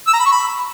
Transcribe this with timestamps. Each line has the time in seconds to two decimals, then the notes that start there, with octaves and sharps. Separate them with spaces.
0.07 E6
0.13 A#5
0.20 B5
0.26 C#6
0.32 B5